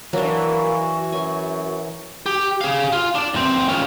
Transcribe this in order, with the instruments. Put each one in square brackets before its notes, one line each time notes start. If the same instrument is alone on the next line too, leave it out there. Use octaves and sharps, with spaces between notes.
[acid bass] E3 [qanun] F#3 D4 [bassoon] A#3 [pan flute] F#4
[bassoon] F#2 [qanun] G#5
[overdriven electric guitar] G4
G#4 F5
F4
D4 D5
E2 C4
C#4 F4